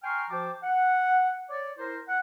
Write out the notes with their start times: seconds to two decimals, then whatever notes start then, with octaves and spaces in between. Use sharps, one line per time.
0.03 G5 G#5 A#5 C6 C#6 F6
0.31 F3 F#4 C5 G5 A5 D6
0.64 F#5
1.50 C#5 D5
1.79 E4 A#4 C5
2.08 F#5